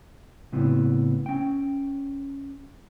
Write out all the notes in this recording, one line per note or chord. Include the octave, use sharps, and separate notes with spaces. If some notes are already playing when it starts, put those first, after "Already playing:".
A2 C#3 B3 C4 E4
C#4 G5